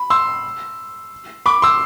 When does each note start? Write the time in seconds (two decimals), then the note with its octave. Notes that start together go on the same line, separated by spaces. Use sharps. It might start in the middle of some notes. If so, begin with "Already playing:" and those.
Already playing: B5
0.10 C6 E6
1.46 B5 D6
1.62 C6 E6